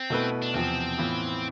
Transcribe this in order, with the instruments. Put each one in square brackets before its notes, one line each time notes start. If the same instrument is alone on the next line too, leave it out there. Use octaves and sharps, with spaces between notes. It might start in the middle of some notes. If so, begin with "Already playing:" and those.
Already playing: [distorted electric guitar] C4
[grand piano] B2 A3 E4 B4
[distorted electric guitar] D4
[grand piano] E2 C3 F3 [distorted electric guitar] C4
[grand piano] A2 E3 B3 F4